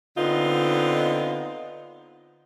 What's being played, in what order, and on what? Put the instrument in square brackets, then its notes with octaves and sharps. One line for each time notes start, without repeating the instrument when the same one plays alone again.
[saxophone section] D3 B3 C4 D#4 F4